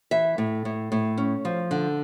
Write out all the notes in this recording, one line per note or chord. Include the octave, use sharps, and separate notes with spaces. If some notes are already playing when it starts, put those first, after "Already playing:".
E3 E5
A2
A2
A2
C#4
F3
D3